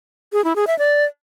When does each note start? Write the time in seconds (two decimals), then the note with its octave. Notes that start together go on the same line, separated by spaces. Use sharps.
0.33 G#4
0.44 E4
0.56 G#4
0.67 E5
0.79 D5